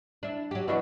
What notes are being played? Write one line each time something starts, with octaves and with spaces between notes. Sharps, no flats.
D4 E4
F#3 G4
B2 E3 F#3 D4 F#4